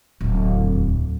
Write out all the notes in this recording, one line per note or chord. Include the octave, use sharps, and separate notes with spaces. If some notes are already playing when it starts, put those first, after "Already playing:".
D1 E2